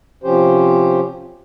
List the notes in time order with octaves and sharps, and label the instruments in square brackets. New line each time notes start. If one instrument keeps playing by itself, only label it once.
[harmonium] C3 F3 C#4 G4 C5